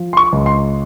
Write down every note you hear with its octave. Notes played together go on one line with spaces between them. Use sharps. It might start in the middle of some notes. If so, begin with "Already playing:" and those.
Already playing: F3
C6
C#6
C#2
C6